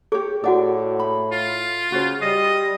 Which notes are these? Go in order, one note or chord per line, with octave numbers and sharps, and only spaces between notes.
G4 G#4 C#5
A2 F#4 D5 F#5 D6
B5
F4
C#3 F#4 C5
G3 D#5